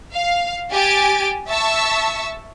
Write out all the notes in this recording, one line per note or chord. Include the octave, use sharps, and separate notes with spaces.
F5
G4 G#5 A6 D7
E5 A5 C#6 E6